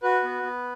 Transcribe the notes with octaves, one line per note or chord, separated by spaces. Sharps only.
F#4 B4
B3
B3